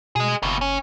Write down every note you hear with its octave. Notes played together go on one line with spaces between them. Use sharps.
B2 G#4 D#5
F#1 D#2 B2
C#4